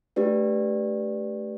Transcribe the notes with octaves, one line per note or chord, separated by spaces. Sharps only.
A3 D4 G4 B4 D5